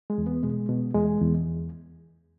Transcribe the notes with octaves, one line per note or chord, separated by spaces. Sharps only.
G#3
E2
B3
B2 G#3
B2
E2 G#3
E2